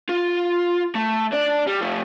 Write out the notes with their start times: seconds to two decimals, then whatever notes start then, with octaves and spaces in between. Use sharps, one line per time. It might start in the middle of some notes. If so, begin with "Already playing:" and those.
0.09 F4
0.95 A3
1.32 D4 D5
1.67 G3
1.81 F3 A3